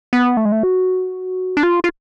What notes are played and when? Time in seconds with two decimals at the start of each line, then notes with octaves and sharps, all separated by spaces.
0.13 B3
0.37 A3
0.45 G#3
0.52 A3
0.63 F#4
1.57 D4
1.63 F4
1.84 F4